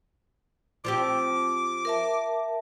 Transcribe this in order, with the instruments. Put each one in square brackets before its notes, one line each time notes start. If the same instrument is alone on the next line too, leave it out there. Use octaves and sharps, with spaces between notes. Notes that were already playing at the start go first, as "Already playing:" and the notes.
[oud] F3 C4 G4 [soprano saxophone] D6
[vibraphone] A#4 E5 A5